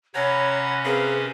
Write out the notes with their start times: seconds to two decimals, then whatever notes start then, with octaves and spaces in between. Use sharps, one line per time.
0.15 C3 C#4 C#5 F#5 A#5 B5
0.85 C4 G#4 A#4 B4 F5